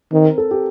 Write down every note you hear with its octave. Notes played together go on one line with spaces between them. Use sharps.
D#3 C4
A#4
A4
G4